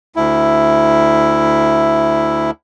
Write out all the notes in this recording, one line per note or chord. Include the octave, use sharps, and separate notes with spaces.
D2 E4